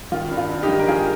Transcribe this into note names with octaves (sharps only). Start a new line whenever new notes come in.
D#3 F4
G2
F4
G2
D#4 G4
D#3
A#4
D#3 F4 G#4